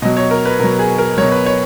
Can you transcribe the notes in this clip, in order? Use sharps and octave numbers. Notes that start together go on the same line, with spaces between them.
B2 F#3 D#5
C#5
A#4
B4
B2 F#3 A#4
G#4
A#4
B2 F#3 C#5
B4
C#5